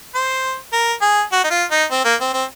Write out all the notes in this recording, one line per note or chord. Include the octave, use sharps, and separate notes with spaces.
C5
A#4
G#4
F#4
D#4
F4
D#4
C4
A#3
C4
C4